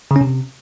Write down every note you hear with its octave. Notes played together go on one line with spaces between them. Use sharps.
C#3
C#4
C3